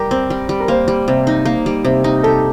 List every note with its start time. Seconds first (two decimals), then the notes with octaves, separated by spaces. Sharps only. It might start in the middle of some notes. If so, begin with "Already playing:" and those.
Already playing: G3 G4 A#4
0.11 C4
0.30 G3
0.49 G3
0.60 A#4
0.68 A#3 C5
0.88 G3
1.08 C3
1.27 D#4
1.45 A#3
1.66 G3
1.85 C3
2.04 D#4
2.23 G4 A4